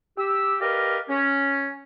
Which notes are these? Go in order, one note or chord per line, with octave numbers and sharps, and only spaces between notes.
G4 E6
G4 A#4 B4 D5 D#5 F5
C#4